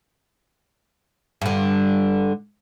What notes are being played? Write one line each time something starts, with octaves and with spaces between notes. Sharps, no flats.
G2 D3